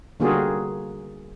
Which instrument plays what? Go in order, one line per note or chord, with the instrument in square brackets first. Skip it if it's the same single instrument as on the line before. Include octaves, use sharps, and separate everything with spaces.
[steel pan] D3 G3 A#3 F4 F#4 G#4